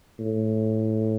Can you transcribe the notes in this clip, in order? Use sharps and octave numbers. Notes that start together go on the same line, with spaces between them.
A2